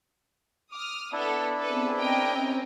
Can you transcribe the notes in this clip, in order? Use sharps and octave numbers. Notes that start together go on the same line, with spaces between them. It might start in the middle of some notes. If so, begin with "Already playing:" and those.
D6 D#6 F6
B3 D4 E4 A4
B3 C4 G#4 A4 B4
C4 C#4 A#4 D#5 G5